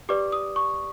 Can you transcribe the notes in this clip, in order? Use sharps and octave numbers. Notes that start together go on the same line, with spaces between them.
G4 B4 D5 D6
D#6
C#6